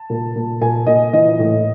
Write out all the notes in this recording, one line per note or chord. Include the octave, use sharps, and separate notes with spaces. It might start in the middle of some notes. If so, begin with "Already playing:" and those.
Already playing: A5
A#2
A#2
A#2 G#5
A#2 D#5
E3 D#5
A2